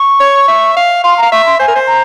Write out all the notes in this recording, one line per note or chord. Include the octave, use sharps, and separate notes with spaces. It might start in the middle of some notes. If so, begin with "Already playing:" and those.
Already playing: C#6
C#5
E5
F5
F5 C6
F5 A#5
E5 C#6
C6
C5 G#5
A#4
C5
A#5